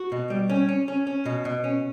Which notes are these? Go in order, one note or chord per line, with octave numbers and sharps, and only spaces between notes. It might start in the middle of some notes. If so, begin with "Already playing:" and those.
Already playing: F#4
B2
G3
C#4
C#4
C#4
C#4
B2
B2
C#4